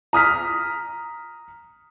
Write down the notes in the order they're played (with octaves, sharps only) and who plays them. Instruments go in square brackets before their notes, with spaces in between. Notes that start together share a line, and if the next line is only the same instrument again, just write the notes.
[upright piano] A#5 D#6 F6 B6